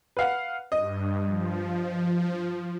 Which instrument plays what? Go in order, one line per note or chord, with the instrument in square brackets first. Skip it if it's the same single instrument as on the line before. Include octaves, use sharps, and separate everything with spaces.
[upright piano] B4 F5 F#5
[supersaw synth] G2 [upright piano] D#5
[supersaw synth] F3